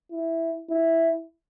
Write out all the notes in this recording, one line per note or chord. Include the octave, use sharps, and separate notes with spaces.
E4
E4